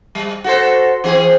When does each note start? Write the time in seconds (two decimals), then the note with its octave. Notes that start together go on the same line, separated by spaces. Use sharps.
0.15 G3
0.44 F#4 A4 C5
1.04 E3 C4 G#4